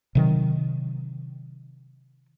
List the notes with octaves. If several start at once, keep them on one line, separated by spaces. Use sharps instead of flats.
C3 D#3 F#3